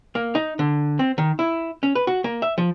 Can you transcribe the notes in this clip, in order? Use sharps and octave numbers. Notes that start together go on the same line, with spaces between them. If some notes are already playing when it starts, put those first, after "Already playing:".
A#3
D#4
D3
C4
D#3
E4
C#4
B4
F#4
A#3
E5
F3